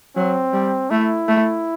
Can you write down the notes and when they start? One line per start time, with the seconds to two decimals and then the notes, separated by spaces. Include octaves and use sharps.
0.16 F#3 C4
0.53 G3
0.91 A3 E4
1.28 A3